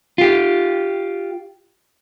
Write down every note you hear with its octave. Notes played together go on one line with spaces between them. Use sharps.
F4 G4